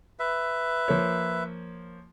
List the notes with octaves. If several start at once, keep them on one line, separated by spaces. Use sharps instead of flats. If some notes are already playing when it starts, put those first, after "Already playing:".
B4 E5
F3 A#3 C#5